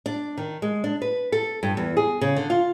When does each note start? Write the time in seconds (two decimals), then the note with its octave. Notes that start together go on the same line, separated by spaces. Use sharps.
0.06 D4
0.37 D#3
0.62 G#3
0.84 D4
1.02 B4
1.32 A4
1.63 G2
1.77 E2
1.97 G#4
2.21 C#3
2.36 D3
2.50 F4